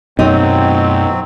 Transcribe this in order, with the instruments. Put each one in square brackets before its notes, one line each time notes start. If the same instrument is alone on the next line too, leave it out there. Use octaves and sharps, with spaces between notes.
[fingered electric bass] F#2 B2 [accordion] F#3 C4 [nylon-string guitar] D#4